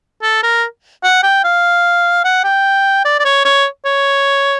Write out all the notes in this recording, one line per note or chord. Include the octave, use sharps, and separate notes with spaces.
A4
A#4
F#5
G5
F5
F#5
G5
D5
D5
C#5
C#5
C#5